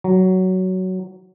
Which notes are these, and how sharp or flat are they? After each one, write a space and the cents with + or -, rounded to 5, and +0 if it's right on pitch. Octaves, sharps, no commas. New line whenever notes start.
F#3 +10